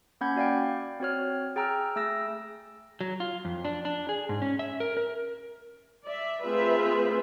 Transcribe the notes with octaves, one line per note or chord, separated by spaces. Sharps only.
A#3 C#4 F#5 B5 G6 G#6
F#4 D5 F5 G5
C4 F#4 C#5 F6
G#4 G5 A#5 E6 F6
A3 G#4 E6 A#6
F#3
F4
F2
D4
D4
G#4
G#2
C#4
E5
A#4
A#4
D5 E5
A3 C4 F4 G#4 B4 E5